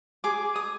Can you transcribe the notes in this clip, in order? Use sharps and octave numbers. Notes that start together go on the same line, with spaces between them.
G#4 D6
D#6